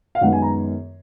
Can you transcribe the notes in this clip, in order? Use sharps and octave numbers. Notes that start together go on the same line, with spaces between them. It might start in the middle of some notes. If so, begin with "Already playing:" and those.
F5
F#2 D#3 G#3 B3 F#5
G#5
A#5